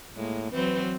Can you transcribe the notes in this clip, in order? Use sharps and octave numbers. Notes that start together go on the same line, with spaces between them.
A2 G#3 A#3
E3 F#3 C4 B4